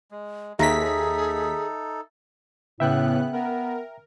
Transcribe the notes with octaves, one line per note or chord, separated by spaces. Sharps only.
G#3
D#2 D#4 G#4 A4 E5 A#5 A#6 B6
A2 C#3 B3 E5 G5 F#6
B3 A#4